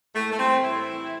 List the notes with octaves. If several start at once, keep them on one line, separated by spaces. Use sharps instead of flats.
A2 A3
A3
E3 G3 C4
A2 E4
E3 G3